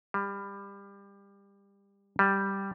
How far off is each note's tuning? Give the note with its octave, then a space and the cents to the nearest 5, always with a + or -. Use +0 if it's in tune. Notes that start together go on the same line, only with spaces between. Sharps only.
G3 +25
G3 +0